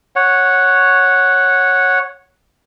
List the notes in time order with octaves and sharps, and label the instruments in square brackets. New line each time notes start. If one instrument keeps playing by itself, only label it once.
[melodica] C#5 F#5